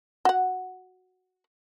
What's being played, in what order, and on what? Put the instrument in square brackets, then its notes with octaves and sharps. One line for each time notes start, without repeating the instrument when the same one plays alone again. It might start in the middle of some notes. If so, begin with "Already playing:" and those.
[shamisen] F#4 F#5